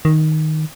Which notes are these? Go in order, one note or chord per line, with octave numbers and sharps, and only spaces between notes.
D#3